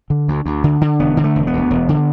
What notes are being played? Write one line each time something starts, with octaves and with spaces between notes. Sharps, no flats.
D3
D2
D2
D3
D3
E1 B3
D3
A3
E1
B3
D2
E1
D3